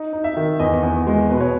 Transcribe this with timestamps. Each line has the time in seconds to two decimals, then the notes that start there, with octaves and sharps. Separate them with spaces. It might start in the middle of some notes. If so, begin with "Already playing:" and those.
Already playing: D#4
0.13 D#4
0.24 E5
0.37 D#3
0.59 E2 D#5
0.83 E2
1.07 G#3
1.30 B2 B4
1.40 C#5